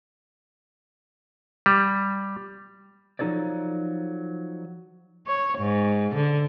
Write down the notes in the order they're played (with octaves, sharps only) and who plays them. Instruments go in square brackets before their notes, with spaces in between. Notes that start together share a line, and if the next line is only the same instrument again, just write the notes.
[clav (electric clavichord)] G3
[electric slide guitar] F3 F#3 D#4 A4 C#5 D5
[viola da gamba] C#5
G#2
D3